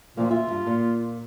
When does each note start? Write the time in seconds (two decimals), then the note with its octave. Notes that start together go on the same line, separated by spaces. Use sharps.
0.17 D2 A#2 F3 A#3
0.31 F4 E5
0.47 E2 G2
0.67 A#2